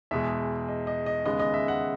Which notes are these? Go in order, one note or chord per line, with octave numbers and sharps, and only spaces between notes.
E2 B2 G#3 E5
D#5
D#5
D#5
D#2 C#3 G#3 B3 D#5
D#5
E5
F#5